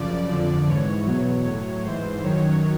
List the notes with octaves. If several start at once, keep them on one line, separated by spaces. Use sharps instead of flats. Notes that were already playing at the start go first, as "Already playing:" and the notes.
Already playing: F#2 C#3 F3 D5
F2 D3 F3
G#2 E3 C#5
E2 B2 F#3
A2 F#3 C#5
G#2 E3 C5
F#2 D#3 F#3 C#5